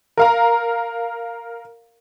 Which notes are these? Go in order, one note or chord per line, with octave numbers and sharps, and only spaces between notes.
A#4 F5 A#5